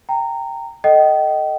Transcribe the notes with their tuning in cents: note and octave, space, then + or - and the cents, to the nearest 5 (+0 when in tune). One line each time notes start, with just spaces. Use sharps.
G5 +0 A#5 -20
A4 +0 D#5 -5 G5 -35